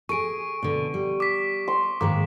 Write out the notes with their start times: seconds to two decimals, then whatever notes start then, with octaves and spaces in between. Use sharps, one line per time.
0.09 G#4 A4 C#6 D7
0.63 B2 D3
0.94 G3
1.20 D6 B6
1.68 C6
2.01 G#2 D#3 G#3 A#3 D6